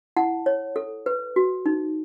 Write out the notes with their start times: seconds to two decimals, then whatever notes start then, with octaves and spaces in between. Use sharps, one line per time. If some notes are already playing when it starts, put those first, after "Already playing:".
0.16 E4 F#5 A5
0.46 C#5
0.76 A4
1.06 B4
1.36 F#4
1.66 D#4